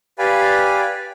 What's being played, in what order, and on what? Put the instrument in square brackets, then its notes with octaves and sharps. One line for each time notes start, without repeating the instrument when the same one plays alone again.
[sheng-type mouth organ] G4 B4 D5 F5 G#5 B5